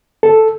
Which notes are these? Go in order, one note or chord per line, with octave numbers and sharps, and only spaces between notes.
A4